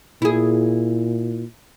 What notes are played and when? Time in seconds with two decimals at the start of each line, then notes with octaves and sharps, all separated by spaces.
0.22 A#2 E4 G#4